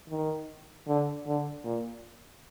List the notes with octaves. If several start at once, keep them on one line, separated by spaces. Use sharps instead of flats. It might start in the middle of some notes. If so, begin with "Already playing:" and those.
D#3
D3
D3
A#2